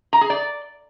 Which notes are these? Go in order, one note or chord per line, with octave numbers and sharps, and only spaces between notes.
A#5
G#4
D5